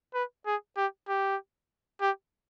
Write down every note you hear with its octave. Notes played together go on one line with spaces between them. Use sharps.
B4
G#4
G4
G4
G4